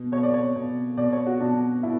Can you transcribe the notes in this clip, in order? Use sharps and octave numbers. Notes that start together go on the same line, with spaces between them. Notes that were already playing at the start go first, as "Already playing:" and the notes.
Already playing: B2
B2 C#5
D5
C#5
B2
B2 D5
C#5
F#4
B2 D4
B2 E4